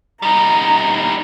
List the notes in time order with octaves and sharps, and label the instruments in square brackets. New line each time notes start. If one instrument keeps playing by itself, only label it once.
[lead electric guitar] G3 D#4 [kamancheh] A#5